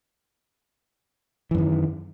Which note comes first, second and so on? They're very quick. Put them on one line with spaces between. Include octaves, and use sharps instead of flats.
E3 F#2 D#3